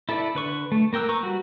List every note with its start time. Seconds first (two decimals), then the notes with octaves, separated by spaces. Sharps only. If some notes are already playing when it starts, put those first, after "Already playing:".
0.09 E4 A4 B4 D5
0.35 D3 B4 C#6
0.72 A3
0.93 A#3 A#4 G5 E6 F#6
1.09 B4 A#5 C#6
1.23 G3 F#4